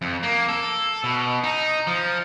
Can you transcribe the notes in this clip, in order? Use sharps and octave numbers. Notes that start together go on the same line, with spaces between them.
F2
A#3
A4
B2
D#4
F3